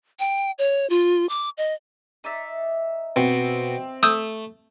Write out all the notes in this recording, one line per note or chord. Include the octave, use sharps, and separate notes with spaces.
G5
C#5
F4
D6
D#5
D#4 D5 E5
B2 C4
A3 D#6 E6 G6